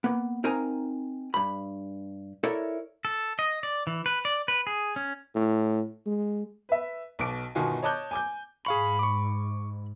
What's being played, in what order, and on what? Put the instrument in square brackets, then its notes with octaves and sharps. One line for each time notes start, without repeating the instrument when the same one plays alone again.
[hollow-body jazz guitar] A#3 B3
C4 D#4 A#4 F5 G#5 A#5
G2 B5
E4 A4 A#4 C#5 D5 E5
[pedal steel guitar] A4
D#5
D5
E3
B4
D5
B4
G#4
C#4
[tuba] A2
G#3
[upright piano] B4 E5
B1 B2 D6 D7
G1 B2 D#3 F4 F#4 G#5
C#5 D#5 A5 D6 F#6 G6
G#5 D6 G6
[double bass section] G#2 [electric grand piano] G#4 F5 C#6 [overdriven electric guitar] B5
[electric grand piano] C#6 D6